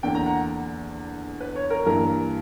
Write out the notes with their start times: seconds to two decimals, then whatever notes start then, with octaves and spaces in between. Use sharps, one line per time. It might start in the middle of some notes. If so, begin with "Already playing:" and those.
0.03 E2 D3 A#3 G5
0.15 A#5
0.26 F#5
1.40 B4
1.55 C#5
1.70 A#4
1.86 G2 E3 A#3 A#4